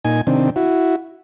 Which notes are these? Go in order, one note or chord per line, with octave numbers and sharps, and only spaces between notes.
A#2 D#4 G#5
C3 D#3 C4 D4
E4 F#4